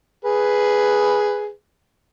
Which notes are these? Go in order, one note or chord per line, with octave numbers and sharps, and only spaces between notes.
G#4 B4